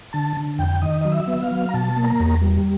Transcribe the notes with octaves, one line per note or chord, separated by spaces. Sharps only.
D3 A5
D3
F2 G5
D#3 D#5
F#3 D#5
E5
B3
F5
F#3
A#5
B2 A5
A#3
A#5
E2
G3